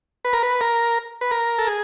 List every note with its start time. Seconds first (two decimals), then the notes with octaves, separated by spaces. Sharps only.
0.25 B4
0.33 A#4
0.43 B4
0.61 A#4
1.21 B4
1.31 A#4
1.58 A4
1.67 G#4